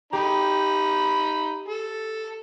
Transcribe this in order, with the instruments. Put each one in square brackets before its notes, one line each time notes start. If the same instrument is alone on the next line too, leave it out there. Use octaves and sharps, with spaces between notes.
[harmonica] D#4 B5 [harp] G4
[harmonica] A4